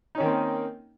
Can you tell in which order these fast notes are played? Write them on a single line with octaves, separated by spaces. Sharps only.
D#4 C#4 D#3 A#3 C4